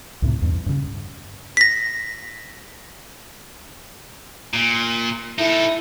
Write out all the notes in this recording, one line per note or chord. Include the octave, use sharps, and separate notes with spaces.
C#2 A2 C3
E2 G2
G2 C#3
A#6 B6
A#2
D#4 E4 A4